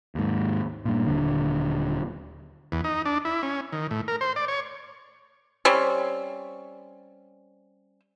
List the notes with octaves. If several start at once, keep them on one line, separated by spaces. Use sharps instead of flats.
D#2 G#2
G2 A#2
D#1 D3
E2
D#4
D4
E4
C#4
D#3
A2
A#4
C5
D5
C#5
G3 C4 C#4